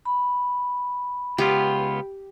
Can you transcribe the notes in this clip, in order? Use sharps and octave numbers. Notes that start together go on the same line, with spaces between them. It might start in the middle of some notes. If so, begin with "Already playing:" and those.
B5
C#2 B3 F4 G4